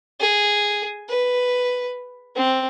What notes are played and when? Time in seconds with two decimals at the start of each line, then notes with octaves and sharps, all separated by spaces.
0.20 G#4
1.09 B4
2.36 C4